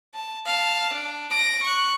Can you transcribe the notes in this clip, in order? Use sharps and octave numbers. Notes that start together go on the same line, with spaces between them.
A5
F5 A5
D4
A#6 D7
C#6 F#6